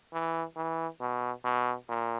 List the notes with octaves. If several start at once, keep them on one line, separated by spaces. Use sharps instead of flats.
E3
E3
B2
B2
A#2